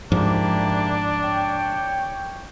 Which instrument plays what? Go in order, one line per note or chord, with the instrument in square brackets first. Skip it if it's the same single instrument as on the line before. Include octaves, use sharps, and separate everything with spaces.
[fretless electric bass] G#2 F3 [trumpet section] A#3 E4 G4 [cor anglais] D4
[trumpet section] C#5 G5